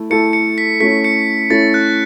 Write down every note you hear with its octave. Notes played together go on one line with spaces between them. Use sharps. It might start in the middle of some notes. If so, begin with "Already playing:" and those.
Already playing: A3 E4
A3 E4 A4 C#7
C#7
B6
A3 C#4 E4 B6
C#7
A3 C#4 E4 A6
F#6